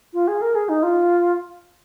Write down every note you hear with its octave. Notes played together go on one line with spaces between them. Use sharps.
F4
G#4
A#4
G#4
D#4
F4